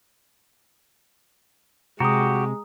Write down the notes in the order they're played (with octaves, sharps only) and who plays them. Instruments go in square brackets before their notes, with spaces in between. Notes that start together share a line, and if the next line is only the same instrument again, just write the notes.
[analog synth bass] C3 [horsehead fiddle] G#3 [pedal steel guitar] F#4 G4 [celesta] A#5 D#6